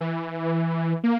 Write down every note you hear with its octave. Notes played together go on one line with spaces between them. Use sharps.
E3
A#3